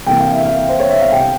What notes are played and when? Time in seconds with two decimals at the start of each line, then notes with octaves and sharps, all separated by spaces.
0.06 C2 C3 E3 A#3 G5
0.20 F5
0.32 E5
0.45 F5
0.69 C5
0.79 C#5
0.90 E5
1.01 F5
1.12 C3 G3 C4 G5